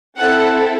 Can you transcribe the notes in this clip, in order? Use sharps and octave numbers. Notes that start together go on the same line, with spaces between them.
C4 E4 A4 F#5